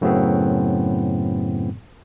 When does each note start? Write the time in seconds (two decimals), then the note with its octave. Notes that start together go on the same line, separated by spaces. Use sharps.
0.01 F#2 A2 C#3 F#3 B3 C4